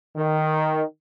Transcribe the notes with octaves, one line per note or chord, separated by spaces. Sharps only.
D#3